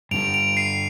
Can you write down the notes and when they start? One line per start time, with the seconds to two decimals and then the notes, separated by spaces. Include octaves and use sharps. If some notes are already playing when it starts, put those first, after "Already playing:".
0.11 G2 D3 G3 D7 F7
0.34 D7 F7
0.57 C7 D#7